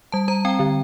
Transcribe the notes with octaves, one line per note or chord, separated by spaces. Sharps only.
G3 A5
G3 A#5
C4 G5
D3